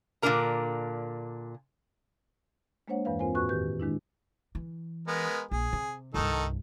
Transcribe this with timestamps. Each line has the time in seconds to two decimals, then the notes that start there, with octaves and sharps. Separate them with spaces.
0.22 A#2 D3 G#3 D4 A#4 A#5
2.88 G#3 A#3 D4 C5 C#5 F#5
3.05 E2 G2 E3 B4 F5
3.19 C4 F4 A#4 C5 G#5
3.35 F2 A2 F#4 B4 C#6 F#6
3.49 D#3 G4 B4 G6
3.80 D#3 G#3 D4 E4
4.55 E3
5.07 G#3 B3 A#4
5.51 A#1 G#4
5.73 C3
6.14 C2 G2 D#3 D#4 A4